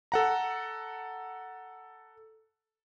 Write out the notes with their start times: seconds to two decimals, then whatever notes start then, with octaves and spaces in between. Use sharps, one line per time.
0.12 A4 F#5 A#5